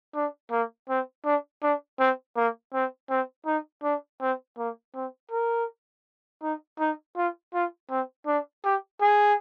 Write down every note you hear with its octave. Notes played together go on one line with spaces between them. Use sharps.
D4
A#3
C4
D4
D4
C4
A#3
C4
C4
D#4
D4
C4
A#3
C4
A#4
D#4
D#4
F4
F4
C4
D4
G4
G#4